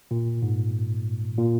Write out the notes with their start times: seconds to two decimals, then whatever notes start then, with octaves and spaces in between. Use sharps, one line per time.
0.11 A#2
0.42 G#2
1.38 A#2